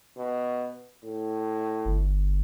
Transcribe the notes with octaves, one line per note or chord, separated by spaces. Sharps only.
B2
A2
G1